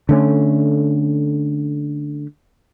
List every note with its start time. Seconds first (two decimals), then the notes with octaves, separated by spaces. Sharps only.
0.09 D3 A3 C#4